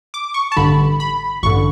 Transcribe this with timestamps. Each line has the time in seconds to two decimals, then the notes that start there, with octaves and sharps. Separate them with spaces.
0.14 D6
0.34 C#6
0.52 A5
0.57 A1 G2 D3 B5
1.00 B5
1.43 A1 G2 D3 C#6